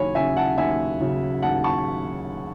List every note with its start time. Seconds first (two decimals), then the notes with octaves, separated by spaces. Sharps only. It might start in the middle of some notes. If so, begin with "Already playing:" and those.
Already playing: D#2 C#3 F#3 C#4 C#5 G#5 B5
0.15 C#3 F#3 C#4 E5 G#5
0.37 F#5 A5
0.58 D#2 E5 G#5
1.00 C#3 F#3 C#4
1.42 D#2 F#5 A5
1.64 A5 C#6